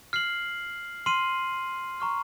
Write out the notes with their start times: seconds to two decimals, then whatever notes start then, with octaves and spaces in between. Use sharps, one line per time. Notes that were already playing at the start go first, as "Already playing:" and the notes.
0.13 F6 C7 F#7
1.06 C6 F6 C7 D#7 F#7
2.00 A#5 C#6 F6